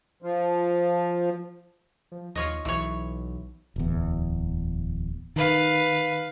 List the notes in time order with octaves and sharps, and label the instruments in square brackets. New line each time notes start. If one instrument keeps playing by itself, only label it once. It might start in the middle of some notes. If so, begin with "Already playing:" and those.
[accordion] F3
[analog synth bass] F3
[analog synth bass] D#2 [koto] F4 C#5 D#5
[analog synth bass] B1 [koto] E3 C#5
[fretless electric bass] D1 E2
[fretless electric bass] D#3 [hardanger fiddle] B4 F5